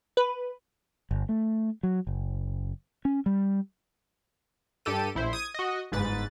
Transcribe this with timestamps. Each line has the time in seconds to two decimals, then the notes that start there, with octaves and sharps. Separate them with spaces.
0.17 B4
1.11 G1
1.29 A3
1.83 F#3
2.07 F#1
3.05 C#4
3.26 G3
4.85 G2 G4 A4 D#7
5.15 A#1 E4 C5
5.33 D#6 G#6 D#7
5.54 F#4 D#5
5.92 G1 G#2 B4 A6